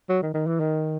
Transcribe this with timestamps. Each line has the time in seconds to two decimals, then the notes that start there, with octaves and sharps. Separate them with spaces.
0.09 F#3
0.22 D#3
0.34 D#3
0.47 E3
0.60 D#3